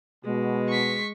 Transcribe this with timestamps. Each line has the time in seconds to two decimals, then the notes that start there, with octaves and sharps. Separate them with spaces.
0.25 B2 G#3
0.69 C#6 B6